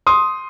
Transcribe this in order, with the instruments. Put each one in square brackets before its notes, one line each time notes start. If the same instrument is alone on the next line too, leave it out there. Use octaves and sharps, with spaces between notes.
[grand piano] C6 D#6